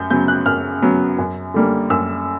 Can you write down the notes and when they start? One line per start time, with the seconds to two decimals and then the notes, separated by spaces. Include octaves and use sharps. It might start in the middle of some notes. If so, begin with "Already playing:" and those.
Already playing: F#2 G6
0.10 C#3 F#3 B3 G6
0.28 F#6
0.46 F#2 F6
0.82 C#3 F#3 B3
1.19 F#2
1.54 D3 G3 A#3
1.90 F#2 E6